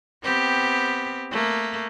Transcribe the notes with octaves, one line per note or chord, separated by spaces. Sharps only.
B3 C4 G4
A3 A#3